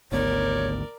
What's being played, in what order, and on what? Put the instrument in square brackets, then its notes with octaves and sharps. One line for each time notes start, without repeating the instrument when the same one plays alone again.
[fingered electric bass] G#1 D2 B3 [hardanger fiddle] A#4 D5 [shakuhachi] C#5